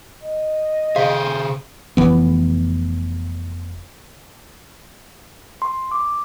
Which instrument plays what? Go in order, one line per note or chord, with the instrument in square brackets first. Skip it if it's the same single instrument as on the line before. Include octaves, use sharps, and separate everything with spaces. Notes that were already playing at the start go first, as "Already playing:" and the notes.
[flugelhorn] D#5
[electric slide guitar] C3 G#4 [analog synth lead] C5 [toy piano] F5
[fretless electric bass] F1 E3 B3
[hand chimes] C6
D6